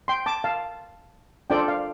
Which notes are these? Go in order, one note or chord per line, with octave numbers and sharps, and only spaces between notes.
G5 C6
A5 D6
F5 A5
D4 F4 A4 C5 D5 G5
F5